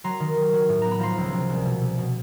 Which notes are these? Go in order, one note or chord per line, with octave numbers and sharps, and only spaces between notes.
F#3 A#5 C6
D#3
D#3
F#3
A2
B3 A#5
B5
F3 A#5 C6
C#2
C3
C2
B2
C2
B2